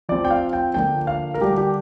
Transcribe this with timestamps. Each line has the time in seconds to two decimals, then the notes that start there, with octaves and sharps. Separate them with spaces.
0.09 F3 C4 D5
0.25 G5
0.31 F5
0.53 G5
0.74 D3 F3 A#3 D4 G5
1.07 F5
1.34 A#4
1.40 D3 G3 D4 G4
1.58 G4